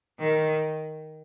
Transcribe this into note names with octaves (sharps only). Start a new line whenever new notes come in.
D#3